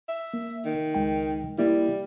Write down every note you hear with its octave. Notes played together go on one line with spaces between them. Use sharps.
E5
A#3
D#3
C#2 G#3 G5
G3 A#3 E4